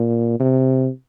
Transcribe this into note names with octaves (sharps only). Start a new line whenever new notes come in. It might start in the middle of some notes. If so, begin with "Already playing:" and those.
Already playing: A#2
C3